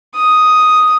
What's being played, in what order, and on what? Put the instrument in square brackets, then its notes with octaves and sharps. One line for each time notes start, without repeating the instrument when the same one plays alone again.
[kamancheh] D#6